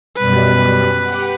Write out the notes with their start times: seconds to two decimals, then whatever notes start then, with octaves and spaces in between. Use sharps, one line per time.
0.17 F#2 B2 G3 B4
1.02 G4 F#5